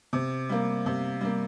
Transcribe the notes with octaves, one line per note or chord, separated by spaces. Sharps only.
C3
G3 A#3
C3
G3 A#3